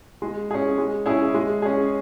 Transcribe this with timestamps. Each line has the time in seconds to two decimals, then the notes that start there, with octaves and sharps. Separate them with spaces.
0.22 G#3
0.51 C#4 G#4
0.78 G#3
1.06 C#4 E4 G#4
1.34 G#3
1.62 C#4 G#4